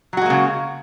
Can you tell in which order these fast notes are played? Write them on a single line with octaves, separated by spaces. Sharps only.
F#3 F#4 G#3 A#3 C#3